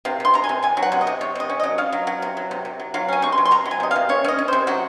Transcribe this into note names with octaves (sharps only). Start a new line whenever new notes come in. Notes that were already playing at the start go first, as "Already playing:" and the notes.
C3 F5
C3 C6
C3 A#5
G#5
C3
C3 G#5
F#3
F#5
C3
D#5
C3
C3 C#5
C3 D#5
C#4
F#3 D#5
C#4 F5
F#3
F#3
C3
F#3
C3
C3
F#3
F#3 F5
C#4 G#5
C3 C#6
C6
F#3
C6
C3 A#5
F#3
G#5
C3 D#5
C3 F5
C#4 C#5
C#4 D#5
C#4
C3 C5
F#3 F#4